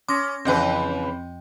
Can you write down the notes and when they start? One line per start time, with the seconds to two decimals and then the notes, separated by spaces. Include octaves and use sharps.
0.08 C#4 C6 D6 D#6 A#6
0.45 F2 C#3 E3 F3 C4 B4 D#5 G5